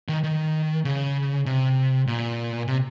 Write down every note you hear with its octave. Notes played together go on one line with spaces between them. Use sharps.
D#3
D#3
C#3
C3
A#2
C3